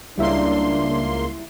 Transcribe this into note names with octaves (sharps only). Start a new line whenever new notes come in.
C#2 G3 A#3 D4 E4 E5 C6